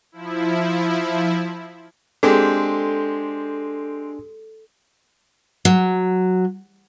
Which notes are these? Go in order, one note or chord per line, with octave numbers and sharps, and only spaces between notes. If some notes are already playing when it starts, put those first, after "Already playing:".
F3 E4
G#3 C4 D4 G4 A4 G#5
F#3